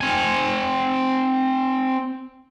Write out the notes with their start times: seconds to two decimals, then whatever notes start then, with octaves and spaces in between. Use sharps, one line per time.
0.01 C4 G#5